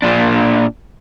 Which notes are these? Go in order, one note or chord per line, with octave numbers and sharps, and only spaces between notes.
A#2 D4